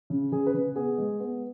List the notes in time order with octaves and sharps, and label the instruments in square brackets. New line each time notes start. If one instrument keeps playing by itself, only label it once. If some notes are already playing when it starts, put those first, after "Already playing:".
[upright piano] C#3
C#3 G#4
B4
C#3
B3 G#4
G#3
B3